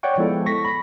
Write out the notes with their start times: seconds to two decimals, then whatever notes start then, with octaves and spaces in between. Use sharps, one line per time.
0.03 C#5 D5 F#5 G5 C#6
0.18 F3 G#3 B3 E4 A4
0.46 C#6 A#6 B6
0.65 B5